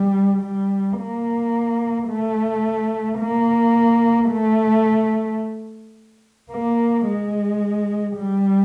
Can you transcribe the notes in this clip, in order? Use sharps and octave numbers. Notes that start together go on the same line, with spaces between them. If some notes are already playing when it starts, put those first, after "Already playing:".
Already playing: G3
G3
A#3
A3
A#3
A3
A#3
G#3
G3